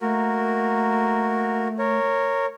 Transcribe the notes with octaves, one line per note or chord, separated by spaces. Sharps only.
A3 A#3 F#4 A#4
A#4 C#5